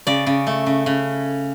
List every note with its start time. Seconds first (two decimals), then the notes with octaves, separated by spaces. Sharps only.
0.07 C#3 D5
0.27 C#3
0.47 A3
0.66 C#3
0.86 C#3